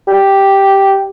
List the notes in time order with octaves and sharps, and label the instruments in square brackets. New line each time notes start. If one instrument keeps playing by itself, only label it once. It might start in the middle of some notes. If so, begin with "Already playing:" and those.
[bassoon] G4